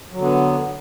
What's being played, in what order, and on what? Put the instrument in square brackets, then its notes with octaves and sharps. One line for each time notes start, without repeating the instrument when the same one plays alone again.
[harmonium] F#3
D3
B3